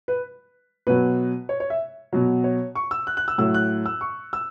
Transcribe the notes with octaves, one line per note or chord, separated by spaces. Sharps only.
B4
B2 F#3 B4
C#5
C#5
E5
B2 F#3
C#5
C#6
E6
F#6
F#6
E6
A2 F#3 E6
F#6
E6
C#6
E6